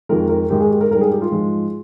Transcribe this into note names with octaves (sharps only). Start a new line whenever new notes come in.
F2 D#3 G#3 A#4
A#4
G#2 D#3 G#3 G4
G#4
G4
A#4
G#2 G3 A#4
G#4
G4
F4
G#2 F3 G#3